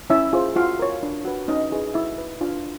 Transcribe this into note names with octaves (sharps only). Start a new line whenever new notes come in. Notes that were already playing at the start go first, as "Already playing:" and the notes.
C#4 E4 E5
F4 G#4 C5
F4 F#4 F5
A#4 C#5
D4
F#4 B4
C#4 D#4 D#5
E4 G#4 B4
E4 F#4 E5
B4
D4 F4 F5